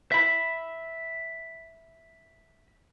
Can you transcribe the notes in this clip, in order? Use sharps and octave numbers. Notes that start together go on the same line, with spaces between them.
E5 B5